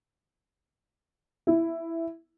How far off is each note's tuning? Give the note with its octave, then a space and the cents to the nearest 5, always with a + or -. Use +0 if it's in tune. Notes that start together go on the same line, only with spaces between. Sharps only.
E4 +5